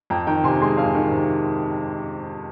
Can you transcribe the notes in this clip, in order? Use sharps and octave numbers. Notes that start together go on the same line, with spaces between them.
F2 G5 A#5
D#3 G5 A#5
C3 G#5 C6
G#3 G#5 C6
F2 F5 G#5
D#3
C3